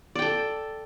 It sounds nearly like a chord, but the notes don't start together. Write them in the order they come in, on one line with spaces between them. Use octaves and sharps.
D5 G5 A4